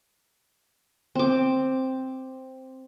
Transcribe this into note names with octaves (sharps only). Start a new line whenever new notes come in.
C4 D6